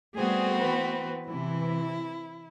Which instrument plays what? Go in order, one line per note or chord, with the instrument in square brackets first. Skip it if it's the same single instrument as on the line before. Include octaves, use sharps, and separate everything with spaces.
[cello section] G3 A3 G#4 [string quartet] B3 C4 F#4
[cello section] E3 B4
[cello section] C3 E3 [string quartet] E4